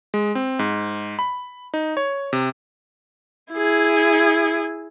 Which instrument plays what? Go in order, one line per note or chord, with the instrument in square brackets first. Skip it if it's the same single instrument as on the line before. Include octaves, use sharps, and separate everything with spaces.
[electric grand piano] G#3
C4
G#2
B5
D#4
C#5
C3
[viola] E4 G#4